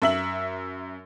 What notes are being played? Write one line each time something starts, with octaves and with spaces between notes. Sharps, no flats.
F#2 E5 F#7